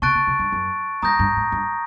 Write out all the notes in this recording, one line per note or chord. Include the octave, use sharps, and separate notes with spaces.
C3 A5 C#6 F#6 A6 D7
C#3
C3
G2
F#2
G2 A#5 D#6 G6 A#6
G2
G#2
G2